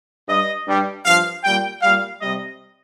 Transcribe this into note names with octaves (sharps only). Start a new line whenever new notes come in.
G2 G3 D#5
G2 G3
G2 F3 F5
A#2 G3 G5
A#2 G3 F5
C3 G3 D#5